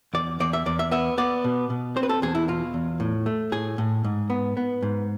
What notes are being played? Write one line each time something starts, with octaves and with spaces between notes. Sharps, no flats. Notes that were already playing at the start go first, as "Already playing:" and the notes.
E2 D5
E2 D5
E5
E2 D5
E5
B3 E5
B3 D5
B2
B2
C4 C5
B4
A4
E2 G#4
E4
B2 F4
E2
A2
A3
A2 G#4
A2
G#2
B3
B3
G#2